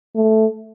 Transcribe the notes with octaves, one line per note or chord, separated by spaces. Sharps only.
A3